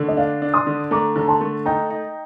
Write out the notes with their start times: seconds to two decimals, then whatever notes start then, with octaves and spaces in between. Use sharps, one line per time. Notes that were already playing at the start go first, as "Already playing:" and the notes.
Already playing: D3 A3
0.08 D#5
0.17 D4 D5 F5
0.42 D4
0.54 C6 D#6
0.67 D3
0.91 A3 A#5 D6
1.16 D3 A#5
1.28 A5 C6
1.41 A3
1.66 D#4 G5 A#5
1.90 D#4